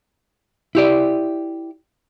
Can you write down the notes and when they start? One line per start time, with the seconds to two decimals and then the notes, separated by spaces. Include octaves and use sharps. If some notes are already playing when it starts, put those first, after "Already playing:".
0.75 E4 G4 D5